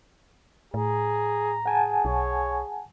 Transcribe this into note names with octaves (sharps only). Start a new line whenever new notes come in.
A2 G#4 A#5
G#4 F#5 G#5 A5
B1 C#5